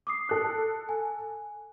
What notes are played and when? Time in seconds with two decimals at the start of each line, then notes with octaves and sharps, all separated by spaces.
0.07 D6 D#6 C7
0.29 A4 F#6
0.89 G#5